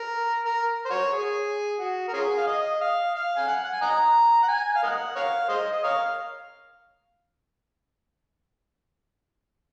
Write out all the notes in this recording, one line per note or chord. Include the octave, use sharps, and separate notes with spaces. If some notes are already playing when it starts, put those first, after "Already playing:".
Already playing: A#4
A#4
C5
F#4 A#4 C#5
G#4
F#4
A#4
C#4 F4 G#4
F5
D#5
F5
F5
G#5
F#5
F#5
G#5
D#5 F#5 A#5
F#5
G#5
F5
A#4 D#5 F#5
A#4 C#5 F5
G#4 C5 D#5
D#5
A#4 C#5 F5